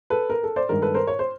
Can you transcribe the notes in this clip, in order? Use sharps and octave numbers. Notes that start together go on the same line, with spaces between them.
A4 B4
A#4
A4
C5 D5
G2 D#3 G#3 A#4
A4 B4
A#4 C5
C#5
C5